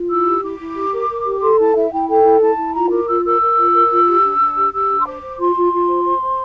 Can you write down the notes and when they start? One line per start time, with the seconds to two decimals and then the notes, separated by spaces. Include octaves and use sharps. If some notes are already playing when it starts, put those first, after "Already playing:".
Already playing: F4
0.10 E4 E6
0.26 G4
0.43 E4 D6
0.59 E4
0.76 G4
0.93 A#4
1.09 A#4
1.25 G4
1.42 A4 C6
1.58 E4 A5
1.75 E4 E5
1.91 E4 G5
2.08 A4 G5
2.24 E4
2.41 E4 A5
2.58 E4
2.74 F4 A#5
2.91 A#4 D6
3.07 F4 E6
3.24 A#4 E6
3.40 A#4
3.56 F4
3.73 A#4
3.90 F4
4.07 G4
4.23 D4
4.39 D4
4.56 G4
4.72 G4 E6
4.89 D4
5.00 C6
5.05 C5 D6
5.22 C5
5.39 F4 C6
5.55 F4
5.72 F4
5.88 C5
6.05 C5
6.22 C5